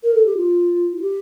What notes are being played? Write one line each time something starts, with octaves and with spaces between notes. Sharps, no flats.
A#4
A4
G4
F4
F4
G4